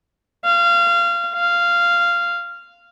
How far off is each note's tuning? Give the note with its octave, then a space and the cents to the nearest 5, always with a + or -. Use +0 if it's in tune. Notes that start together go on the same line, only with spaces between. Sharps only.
F5 -25
F5 -10